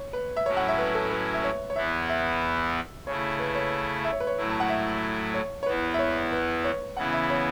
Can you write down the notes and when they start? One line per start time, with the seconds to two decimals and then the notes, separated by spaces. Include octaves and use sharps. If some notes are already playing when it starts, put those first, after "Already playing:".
Already playing: C#5
0.13 B4
0.36 E5
0.46 A2 F#3 C#4 E4 C#5
0.57 F#5
0.68 E5
0.78 B4
0.95 A4
1.10 B4
1.34 E5
1.44 C#5
1.70 C#5
1.76 E2 E3 B3 E4 E5
2.09 E5
3.06 C#3 A3 E4 C#5
3.39 B4
3.55 C#5
4.05 E5
4.12 C#5
4.20 B4
4.27 C#5
4.37 A2 F#3 A3 E4
4.50 A5
4.60 F#5
4.69 E5
5.34 C#5
5.63 C#5
5.66 E2 E3 B3 E4 B4
5.94 E5
5.99 C#5
6.32 B4
6.64 C#5
6.97 C#3 E3 B3 E4 F#5
7.13 E5
7.30 C#5